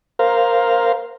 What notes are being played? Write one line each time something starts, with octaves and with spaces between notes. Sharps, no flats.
A#4 C5 F5